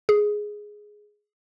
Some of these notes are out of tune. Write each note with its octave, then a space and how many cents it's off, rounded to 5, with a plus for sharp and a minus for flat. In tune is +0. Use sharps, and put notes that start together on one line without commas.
G#4 +5